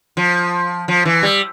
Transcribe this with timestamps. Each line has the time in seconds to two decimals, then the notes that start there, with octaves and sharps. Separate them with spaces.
0.17 F3
0.88 F3
1.05 E3
1.23 G3